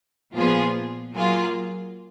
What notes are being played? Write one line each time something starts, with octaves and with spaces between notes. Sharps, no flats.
A#2 F3 B3 F4 G#4
F#3 A#3 F4 G#4